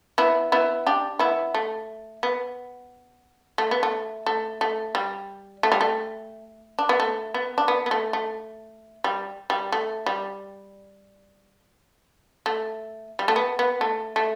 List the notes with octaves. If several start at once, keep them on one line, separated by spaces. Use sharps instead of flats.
B3 E4
B3 E4
D4 G4
B3 E4
A3
B3
A3
B3
A3
A3
A3
G3
A3
G3
A3
D4
B3
A3
B3
D4
B3
B3
A3
A3
G3
G3
A3
G3
A3
G3
A3
B3
B3
A3
A3